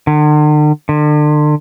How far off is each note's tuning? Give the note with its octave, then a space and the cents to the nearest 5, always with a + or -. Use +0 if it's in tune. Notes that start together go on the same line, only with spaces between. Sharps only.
D3 +45
D3 +35